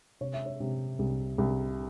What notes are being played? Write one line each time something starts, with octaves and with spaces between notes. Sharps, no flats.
C3 C#5
E5
C#5
C3
C2
C2